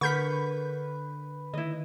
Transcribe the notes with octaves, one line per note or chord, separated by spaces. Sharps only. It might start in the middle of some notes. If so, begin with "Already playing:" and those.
D3 A#4 B4 F#5 C#6 G6 B6
D#3 E4 D#5